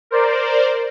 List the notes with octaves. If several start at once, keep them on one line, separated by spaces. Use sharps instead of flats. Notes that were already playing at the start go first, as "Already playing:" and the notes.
A#4 C5 D5